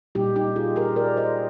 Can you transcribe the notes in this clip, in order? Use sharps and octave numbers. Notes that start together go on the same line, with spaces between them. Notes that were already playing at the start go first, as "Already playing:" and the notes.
A#2 G3 A#3 D#4 G4
D#4 G4
F4 G#4
G4 A#4
A#4 D5
C5 D#5